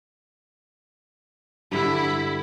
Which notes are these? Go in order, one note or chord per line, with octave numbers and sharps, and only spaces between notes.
G2 D3 G3 E4